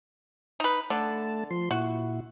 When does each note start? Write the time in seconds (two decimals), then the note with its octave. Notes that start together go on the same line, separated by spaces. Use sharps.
0.60 D#4 B4
0.90 D3 A3 A5
1.51 F3 C6
1.71 A#2 E4 F#4